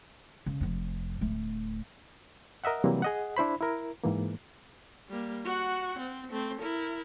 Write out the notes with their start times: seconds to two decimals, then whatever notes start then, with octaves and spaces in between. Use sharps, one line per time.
0.46 C#3
0.61 F1 F2
1.21 D1 A3
2.64 A#4 D#5 E5 F#5
2.84 C3 E3 F#3 G3 A#3 C4
3.02 G#4 D#5 F#5
3.37 D4 E4 C5 B5
3.60 E4 A#4
4.03 G#2 E3 A#3
5.09 G3 A#3
5.45 F#4 F#5
5.99 C4
6.31 A3 C4
6.61 E4 A#4